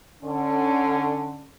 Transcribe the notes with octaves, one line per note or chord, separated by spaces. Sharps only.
D3 C#4